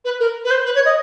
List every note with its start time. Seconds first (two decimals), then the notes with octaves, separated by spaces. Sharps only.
0.04 B4
0.19 A#4
0.44 B4
0.50 C5
0.65 B4
0.75 C#5
0.85 D#5